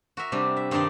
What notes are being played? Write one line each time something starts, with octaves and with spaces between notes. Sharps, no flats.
F#4 A#4 E5
C3 G3 D4
E5
G2 D#3 D4 D#4 D5 C6